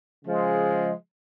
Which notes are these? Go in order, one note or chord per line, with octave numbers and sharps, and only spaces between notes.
C#3 F3 G#3